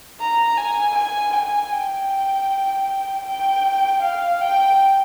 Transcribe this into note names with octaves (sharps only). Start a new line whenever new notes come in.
A#5
G#5
G#5
G#5
G5
G5
F5
G5